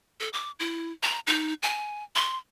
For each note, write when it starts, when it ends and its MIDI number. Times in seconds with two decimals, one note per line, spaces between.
0.20 0.29 69
0.33 0.51 86
0.60 0.92 64
1.03 1.20 82
1.27 1.54 63
1.63 2.04 80
2.15 2.38 84